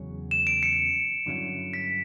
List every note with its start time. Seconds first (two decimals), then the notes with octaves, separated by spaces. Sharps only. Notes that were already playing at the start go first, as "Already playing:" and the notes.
Already playing: E2 C#3 F#3 C#4
0.31 E7
0.47 D7
0.63 C#7
1.26 G2 D3 F#3 C#4 E4
1.73 B6